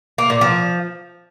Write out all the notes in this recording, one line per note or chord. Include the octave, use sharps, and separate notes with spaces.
A#3
A#2
F3